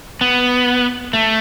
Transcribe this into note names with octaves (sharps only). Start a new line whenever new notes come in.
B3
A3